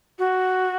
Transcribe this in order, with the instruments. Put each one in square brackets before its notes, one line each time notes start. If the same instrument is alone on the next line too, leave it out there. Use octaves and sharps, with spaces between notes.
[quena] F#4